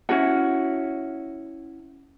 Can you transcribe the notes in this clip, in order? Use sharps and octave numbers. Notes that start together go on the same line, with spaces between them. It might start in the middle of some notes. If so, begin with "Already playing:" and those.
C#4 E4 F#4 F#5